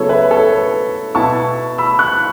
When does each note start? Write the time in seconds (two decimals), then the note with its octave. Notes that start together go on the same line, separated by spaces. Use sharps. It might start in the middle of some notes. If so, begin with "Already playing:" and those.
Already playing: C#3 F#3 B3 E4 A4 C#5
0.09 B4 E5
0.31 A4 C#5
0.52 B4
1.14 B2 B3 E4 A5 C#6
1.78 B5 E6
1.99 C#6 F#6